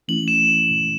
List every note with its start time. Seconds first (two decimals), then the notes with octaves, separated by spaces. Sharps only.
0.08 E3 A3 C#4 E4 F#7
0.28 E7